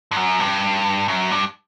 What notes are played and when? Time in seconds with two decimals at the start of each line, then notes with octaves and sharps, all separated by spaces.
0.11 G2
0.16 F#2
0.40 G2
1.08 F#2
1.31 G2